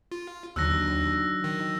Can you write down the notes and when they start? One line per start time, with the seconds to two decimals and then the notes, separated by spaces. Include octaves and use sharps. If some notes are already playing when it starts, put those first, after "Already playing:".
0.12 F4
0.56 D#2 D3 D#3 F#3 E6 F#6 A#6
1.44 D#3